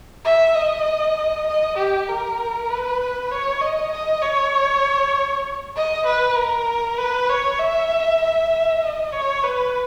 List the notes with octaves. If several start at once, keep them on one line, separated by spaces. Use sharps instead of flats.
E5
D#5
D#5
G4
A#4
B4
C#5
D#5
D#5
C#5
D#5
B4
A#4
B4
C#5
E5
E5
D#5
C#5
B4